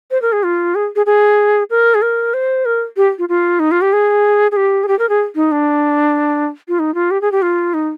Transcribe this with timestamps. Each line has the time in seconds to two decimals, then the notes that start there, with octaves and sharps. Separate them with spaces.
0.11 C5
0.22 A#4
0.32 G#4
0.43 F4
0.75 G#4
0.96 G#4
1.06 G#4
1.70 A#4
1.94 G#4
2.02 A#4
2.34 C5
2.65 A#4
2.97 G4
3.18 F4
3.29 F4
3.59 D#4
3.71 F4
3.81 G4
3.93 G#4
4.51 G#4
4.56 G4
4.83 G#4
4.88 G4
4.99 A#4
5.09 G#4
5.35 D#4
5.52 D4
6.68 F4
6.79 D#4
6.94 F4
7.11 G4
7.21 G#4
7.32 G4
7.42 F4
7.74 D#4